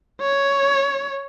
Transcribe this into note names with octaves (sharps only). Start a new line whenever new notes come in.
C#5